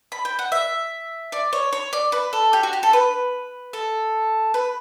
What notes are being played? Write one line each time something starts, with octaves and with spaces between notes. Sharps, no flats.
B5
G5
F#5
E5
D5
C#5
C#5
D5
B4
A4
G4
F#4
G4
A4
B4
A4
B4